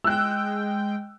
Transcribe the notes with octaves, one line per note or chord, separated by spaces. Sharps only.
G#3 G5 E6 F#6